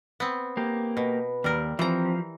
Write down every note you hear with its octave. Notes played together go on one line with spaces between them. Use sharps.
B3 C4
A#3 G4
B2 B4
D#2 G3 A#4
E3 F3 C4 A#5